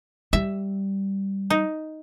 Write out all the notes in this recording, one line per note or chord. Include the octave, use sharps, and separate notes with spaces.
G3 E5
D#4